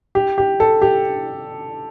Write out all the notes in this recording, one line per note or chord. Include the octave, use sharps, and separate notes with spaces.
G4
G4
A4
G4